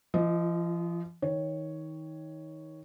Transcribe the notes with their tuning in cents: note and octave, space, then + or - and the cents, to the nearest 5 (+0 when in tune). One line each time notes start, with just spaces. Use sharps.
F3 -40 F4 +0 D#5 +0
D#3 +25 C#5 +0